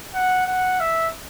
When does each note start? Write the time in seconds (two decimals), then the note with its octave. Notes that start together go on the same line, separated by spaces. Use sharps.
0.15 F#5
0.47 F#5
0.80 E5